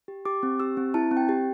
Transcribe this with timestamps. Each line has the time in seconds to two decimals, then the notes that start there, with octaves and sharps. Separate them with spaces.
0.08 G4
0.25 G4 D6
0.43 C4
0.60 G4 E6
0.77 C4
0.94 E4 A5
1.11 C4
1.17 G5
1.29 G4